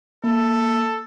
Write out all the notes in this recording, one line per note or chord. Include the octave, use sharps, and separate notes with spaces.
A#3 A4